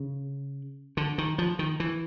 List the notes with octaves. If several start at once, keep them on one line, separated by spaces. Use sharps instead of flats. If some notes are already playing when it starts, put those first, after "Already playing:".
Already playing: C#3
D3
D#3
F3
D#3
E3